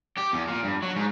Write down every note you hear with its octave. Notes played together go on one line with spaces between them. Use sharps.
G4
E2
A#2
G2
F#3
G#2